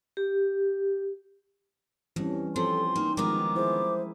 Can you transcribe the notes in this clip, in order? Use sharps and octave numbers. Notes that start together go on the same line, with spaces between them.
G4
F2 E3 G3 C#4
F3 C4 A4 C6
A#3 D#4
D#3 F3 G#3 B3 A#4 D6
E4 G#4 C5